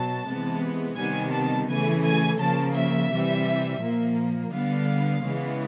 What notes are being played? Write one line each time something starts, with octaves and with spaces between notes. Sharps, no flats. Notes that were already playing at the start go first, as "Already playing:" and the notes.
Already playing: B2 F#3 A5
C3 E3 G#3 B3
C3 D#3 G3 B3 G#5
A5
C#3 E3 A3 G#5
G#5
C#3 F3 A#3 A5
E5
C3 E3 G3
A#2 F3 A#3
D3 G3 B3 F5
C#3 E3 G#3 B3